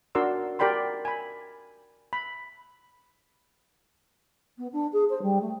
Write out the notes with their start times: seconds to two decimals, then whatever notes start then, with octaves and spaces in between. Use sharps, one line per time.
0.15 D4 F#4 A#4 D5 C6 E6
0.59 G4 A#4 D5 G5 B5 C6
1.05 G#5 B5
2.13 B5
4.57 B3
4.72 D4
4.92 G#4
5.09 C5
5.22 G3
5.41 A3